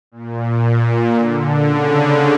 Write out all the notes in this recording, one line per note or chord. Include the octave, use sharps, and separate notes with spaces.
A#2
A#2
D3
C#3